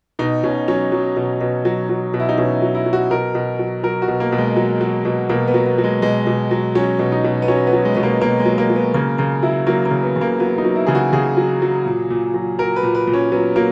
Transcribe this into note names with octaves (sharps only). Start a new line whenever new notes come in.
B2 D#4
B2 C#4
F#3 C#4
F#3
B2
B2
F#3
F#3
B2
E4
D#4
B2 C#4
E4
F#3
E4
F#3
F#4
B2 A#4
B2
F#3
F#3 A#4
F#4
B2
A#3
B2
G#3
F#3
F#3
B2
B2 A#3
B3
F#3
B3
F#3
G#3
B2 G#3
B2
F#3
F#3 C#4
B2
D#4
B2
B3
F#3 C#4
B3
F#3
G#3
B2 B3
A#3
B2 A#3
G#3
F#3
A#3
F#3
B3
C#3 A#3
C#3 A#3
F#3 E4
F#3 A#3
A#3
C#3
B3
C#3
A#3
F#3 B3
D#4
F#3
E4
C#3 G#4
F#4
C#3 G#4
F#3
F#3
A#2
A#2
F#3
F#3 A#4
B4
A#2
B4
A#2
C#4
F#3 B3
F#3 A#3